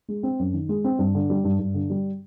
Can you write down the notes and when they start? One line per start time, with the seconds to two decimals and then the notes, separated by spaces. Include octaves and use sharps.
0.08 G#3
0.23 C4
0.39 F#2
0.53 D#3
0.69 G#3
0.84 C4
0.99 G2
1.15 D3
1.30 G3
1.44 G2
1.59 G2
1.74 D3
1.90 G3